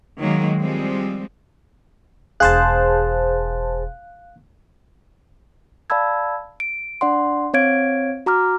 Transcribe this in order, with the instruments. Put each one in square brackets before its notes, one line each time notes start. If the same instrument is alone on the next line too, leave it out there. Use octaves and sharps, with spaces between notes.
[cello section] D#3 F#3 G#3 A#3
F3 G3 G#3 C4
[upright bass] E1 D4 [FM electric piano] G#4 C5 A5 [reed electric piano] F5 F#6
[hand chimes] D5 F5 A5 B5 E6 G#6
D7
D4 D5 F#5 C6
C4 C#5 F5 G#6 D7
F#4 A#5 D6 F6